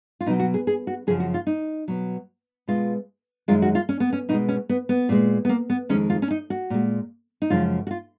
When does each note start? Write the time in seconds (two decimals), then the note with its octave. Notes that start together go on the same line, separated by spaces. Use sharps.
0.21 F4
0.26 B2 D#4
0.30 F#3
0.40 F#4
0.54 G#4
0.67 G#4
0.87 F#4
1.07 F#2 C#3 F3 G#4
1.20 F#4
1.34 F4
1.47 D#4
1.88 B2 F#3
2.68 B2 G#3 F4
3.48 F#2 D#3 G#3 F4
3.62 F#4
3.75 F4
3.89 C#4
4.00 B3
4.13 C#4
4.29 B2 D#4
4.33 G#3
4.49 C#4
4.69 B3
4.89 B3
5.09 A#2 G#3
5.45 B3
5.49 A#3
5.70 B3
5.89 F2 D#3 G#3 C#4
6.10 F4
6.22 C#4
6.31 D#4
6.50 F#4
6.70 A#2 G#3
7.42 D#4
7.50 F#2 C#3 F3 G#3 F4
7.87 F#4
7.91 F4